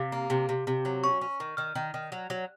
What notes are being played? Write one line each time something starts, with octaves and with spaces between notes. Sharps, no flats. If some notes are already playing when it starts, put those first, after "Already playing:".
Already playing: C3 F5
A#3
C3
C3
C3
F#3
C#4 C#6
C#4
D#3
D#3 F6
D#3
D#3
F#3
F#3